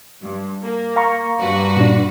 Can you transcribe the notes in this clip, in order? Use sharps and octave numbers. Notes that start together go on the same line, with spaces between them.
G2
A#3
F5 A#5 C#6
G2 F#4 B4
A#2 D4